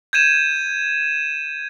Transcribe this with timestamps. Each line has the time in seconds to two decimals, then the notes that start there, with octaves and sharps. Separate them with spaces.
0.13 G6 G#6 D#7 E7